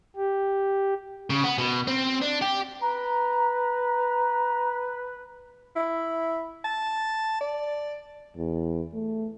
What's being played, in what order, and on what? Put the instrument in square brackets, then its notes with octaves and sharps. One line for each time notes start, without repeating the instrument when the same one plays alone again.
[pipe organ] G4
[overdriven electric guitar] C#3
B3
B2
C4
D4
G4
[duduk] B4 [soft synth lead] A#5
[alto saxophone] E4
A5
D5
[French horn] E2
A3